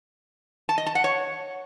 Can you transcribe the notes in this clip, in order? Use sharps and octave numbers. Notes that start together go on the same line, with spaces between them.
A5
D#5
A5
F#5
C#5